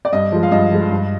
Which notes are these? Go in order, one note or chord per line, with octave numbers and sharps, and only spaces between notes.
D5
G2 D#5
F3 G#3
F5
G2 D#5
F3 G#3
G2